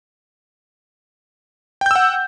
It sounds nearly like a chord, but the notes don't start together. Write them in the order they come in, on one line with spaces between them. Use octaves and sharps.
G5 G6 E6 F#5